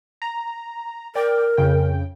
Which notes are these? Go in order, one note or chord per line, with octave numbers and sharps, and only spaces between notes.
A#5
A#4 D5 G5
F2 C#3 G5